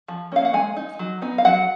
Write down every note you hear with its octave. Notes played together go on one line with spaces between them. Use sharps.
F3
A#3 C#4 F5
F#5
G#3 G#5
D#4
F#3
B3 D#4
F5
F#3 F#5